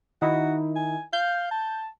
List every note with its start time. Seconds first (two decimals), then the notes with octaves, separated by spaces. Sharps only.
0.22 D#3 D#4 E4 F#4
0.76 G#5
1.13 F5 G6
1.51 A5